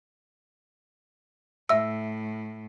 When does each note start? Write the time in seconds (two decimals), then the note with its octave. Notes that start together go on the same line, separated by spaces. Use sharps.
1.69 A2 E5 E6